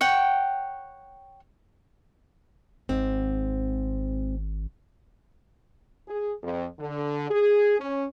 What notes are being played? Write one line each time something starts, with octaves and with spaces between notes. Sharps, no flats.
C#5 F#5 G5
G#1 G#2 C4
G#4
F2
D3
G#4
C#4